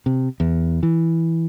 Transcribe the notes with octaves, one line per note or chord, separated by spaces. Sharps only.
C3
E2
E3